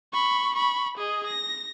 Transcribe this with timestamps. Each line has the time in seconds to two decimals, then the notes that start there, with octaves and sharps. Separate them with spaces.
0.14 B5 C#6
0.56 B5 C#6
0.98 G#4 D#5
1.27 A#6